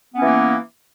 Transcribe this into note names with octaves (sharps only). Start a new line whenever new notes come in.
E3 A#3 B3 C#4